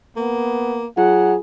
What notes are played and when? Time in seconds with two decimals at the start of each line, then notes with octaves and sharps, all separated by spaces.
0.17 A#3 B3
0.97 F#3 F4 G#4 F#5